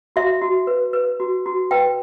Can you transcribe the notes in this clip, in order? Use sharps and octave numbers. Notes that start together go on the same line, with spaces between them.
F#4 E5
F#4
B4
B4
F#4
F#4
B4 G5